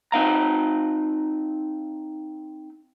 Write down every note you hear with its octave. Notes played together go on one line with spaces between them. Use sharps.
C4 D#4 F5 A#5